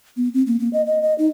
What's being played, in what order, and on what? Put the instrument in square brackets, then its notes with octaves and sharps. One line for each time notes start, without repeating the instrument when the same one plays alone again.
[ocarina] B3
C4
A#3
A#3
D#5
D#5
D#5
D#4